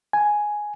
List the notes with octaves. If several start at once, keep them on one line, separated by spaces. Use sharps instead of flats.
G#5